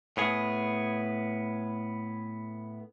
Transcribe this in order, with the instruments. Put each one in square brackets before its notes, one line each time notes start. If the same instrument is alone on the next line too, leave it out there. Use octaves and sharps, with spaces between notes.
[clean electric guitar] A2 B3 G#4